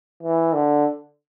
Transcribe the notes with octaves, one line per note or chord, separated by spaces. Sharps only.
E3
D3